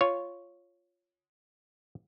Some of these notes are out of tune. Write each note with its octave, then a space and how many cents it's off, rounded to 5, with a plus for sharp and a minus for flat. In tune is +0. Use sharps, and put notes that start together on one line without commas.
F4 +0 C#5 +0